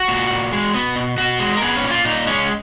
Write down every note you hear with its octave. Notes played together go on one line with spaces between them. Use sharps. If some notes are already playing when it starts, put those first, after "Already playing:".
Already playing: F#4
A#2
A#2
G#3
B3
B2
B2 F#4
G#3
A#4
B3 G#4
C#4
A#2
F4
A#2 D#4
G#3 C#4